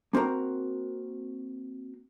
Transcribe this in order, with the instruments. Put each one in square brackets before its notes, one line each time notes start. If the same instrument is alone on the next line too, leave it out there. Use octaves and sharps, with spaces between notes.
[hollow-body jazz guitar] A#3 C4 F#4 A#4 A#5